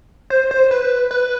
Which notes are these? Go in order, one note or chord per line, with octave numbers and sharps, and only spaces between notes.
C5
C5
B4
B4